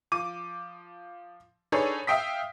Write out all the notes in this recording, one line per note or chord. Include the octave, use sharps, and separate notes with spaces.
F3 D6 D#7
D4 D#4 G#4 A4 B4 C#5
E5 F5 G5 D#6 B6